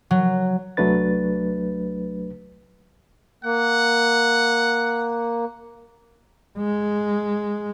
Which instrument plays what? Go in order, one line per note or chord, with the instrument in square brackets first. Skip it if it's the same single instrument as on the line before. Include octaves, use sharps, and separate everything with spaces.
[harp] F#3
[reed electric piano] C2 F#3 A3 D4 B4 A6
[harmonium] A#3 [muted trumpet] F#5
[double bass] G#3